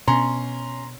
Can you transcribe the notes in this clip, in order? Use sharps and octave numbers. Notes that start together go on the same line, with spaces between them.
B2 C#4 A#5 C6